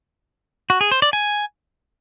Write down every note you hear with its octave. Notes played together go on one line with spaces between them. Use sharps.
F#4
G#4
C5
D5
G#5